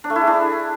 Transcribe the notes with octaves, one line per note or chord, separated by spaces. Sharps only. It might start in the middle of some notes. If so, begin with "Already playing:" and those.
D4
A3
E4
G#4
D4